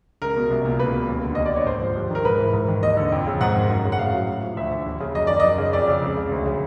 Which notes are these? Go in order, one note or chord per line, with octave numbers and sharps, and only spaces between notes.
C#2 A#4
B2
C2
A#2
C#2 B4
B2
D#2
D3
D#2 D#5
D5
D3 C#5
G#2 C5
F3
G2
D#3 A#4
G#2 B4
E3
G#2
D#3
D#2 D#5
D3
F2
C#3
G#2 F#5
D#3
F#2
C#3
F#5
A2 F5
F#3
A2
F3
D2 E5
D3
D#2
C#3
F#2 D#5
D#3 D5
F#2 D#5
C#3
F2 D5
C#3
C#2
C#3
D2
C#3